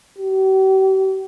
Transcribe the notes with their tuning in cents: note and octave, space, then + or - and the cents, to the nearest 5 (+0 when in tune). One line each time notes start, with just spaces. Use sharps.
G4 -45